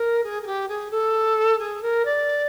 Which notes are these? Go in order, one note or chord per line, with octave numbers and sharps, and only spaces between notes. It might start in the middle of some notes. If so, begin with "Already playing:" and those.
Already playing: A#4
G#4
G#4
G4
G#4
A4
G#4
A#4
D5